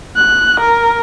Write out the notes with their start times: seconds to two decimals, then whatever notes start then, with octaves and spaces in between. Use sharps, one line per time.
0.16 F#6
0.60 A#4